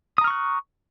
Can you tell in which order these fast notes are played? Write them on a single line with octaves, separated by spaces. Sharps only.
D#6 A#5 F6 C#6 F#6